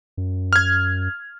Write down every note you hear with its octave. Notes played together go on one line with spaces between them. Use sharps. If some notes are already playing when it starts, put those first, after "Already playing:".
F#2
F6 G#6